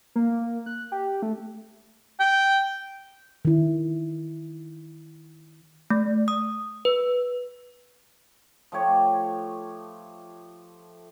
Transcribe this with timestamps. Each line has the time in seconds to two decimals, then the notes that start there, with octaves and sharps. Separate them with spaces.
0.16 A#3
0.66 F#6
0.92 G4
1.22 A3
2.20 G5
3.45 D#3 E4
5.90 A3
6.28 D#6
6.85 B4
8.72 F3 A3 G4 C#5